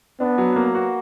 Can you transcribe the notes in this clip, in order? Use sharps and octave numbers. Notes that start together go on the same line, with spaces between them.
B3 D4
F#3
A#3
F#4